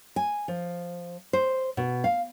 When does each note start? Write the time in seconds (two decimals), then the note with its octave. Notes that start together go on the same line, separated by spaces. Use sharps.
0.16 G#5
0.48 F3
1.33 C5
1.77 B2
2.04 F5